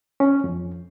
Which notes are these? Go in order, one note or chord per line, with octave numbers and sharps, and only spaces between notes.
C#4
F2